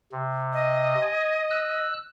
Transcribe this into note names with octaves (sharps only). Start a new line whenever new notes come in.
C3
D#5
G#5
E6 F#6